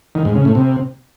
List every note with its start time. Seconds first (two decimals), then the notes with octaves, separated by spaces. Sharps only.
0.15 D#3
0.25 G#2
0.35 C#3
0.45 A2
0.55 C3